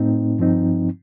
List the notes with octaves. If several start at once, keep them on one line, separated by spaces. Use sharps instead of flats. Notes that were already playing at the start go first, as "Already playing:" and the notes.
Already playing: A2 A3 C4 D#4
G2 F3 C4 D#4